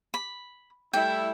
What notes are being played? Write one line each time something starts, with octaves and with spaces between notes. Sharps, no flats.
B5
G3 A3 E4 G5